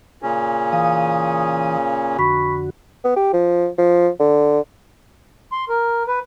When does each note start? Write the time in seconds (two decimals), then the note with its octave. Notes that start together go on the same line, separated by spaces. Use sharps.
0.22 A#2 C#3 C#4
0.73 E3 F5 D#6
2.18 F2 D3 F#4 B5 C#6 B6
3.04 B3
3.17 G4
3.33 F3
3.78 F3
4.19 D3
5.52 C6
5.69 A#4
6.07 B4